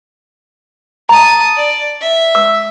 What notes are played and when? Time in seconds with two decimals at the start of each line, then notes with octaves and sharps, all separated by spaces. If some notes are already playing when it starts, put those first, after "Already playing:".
1.09 A5 A#5 D#6
1.57 D5
2.01 E5
2.35 E6